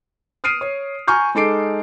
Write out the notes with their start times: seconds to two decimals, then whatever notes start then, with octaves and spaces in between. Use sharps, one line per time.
0.44 D#6 F6 C7 D7 D#7
0.61 C#5
1.07 G#5 A#5 C#6 F6 G6
1.35 G#3 D#4 A4 D6 C7 D7